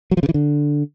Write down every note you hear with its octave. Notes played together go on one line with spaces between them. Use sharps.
F#3
F3
C#3
E3
D3